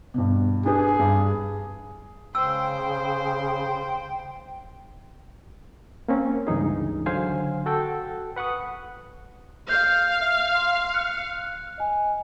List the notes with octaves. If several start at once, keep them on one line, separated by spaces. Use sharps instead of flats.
G2 B2
D4 G4 G#4 B4
G2
C#3 C5 G5 E6
A#3 C4 C#4
C#2 G2 E3 D#4 G#4
D3 F#3 C5 F5 G#5
F#4 A4 G5
B4 F#5 C#6 D#6
F5 G6
E5
C6
F#6 C#7
D#5 G#5